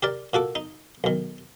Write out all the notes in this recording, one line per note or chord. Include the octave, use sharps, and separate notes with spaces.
G4 A#4 D5
A#2 F#4 A4 D6
D#4
B1 D#3